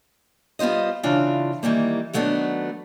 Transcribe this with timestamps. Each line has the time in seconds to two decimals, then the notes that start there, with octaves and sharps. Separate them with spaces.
0.59 G3 B3 F4 C5 D#5
1.03 C#3 E3 D4 F4
1.63 D#3 E3 G3 A#3
2.13 D#3 F#3 A3 B3 D4